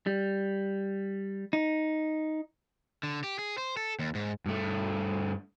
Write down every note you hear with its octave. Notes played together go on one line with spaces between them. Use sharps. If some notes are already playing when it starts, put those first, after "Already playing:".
G3
D#4
D3
G4
G#4
C5
A4
D#2
G#2
G2 A3